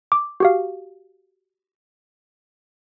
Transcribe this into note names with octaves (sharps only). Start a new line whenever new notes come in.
D6
F#4 G4 F5